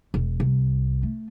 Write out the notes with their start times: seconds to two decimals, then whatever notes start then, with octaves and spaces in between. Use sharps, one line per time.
0.14 E1
0.40 C2
1.03 A3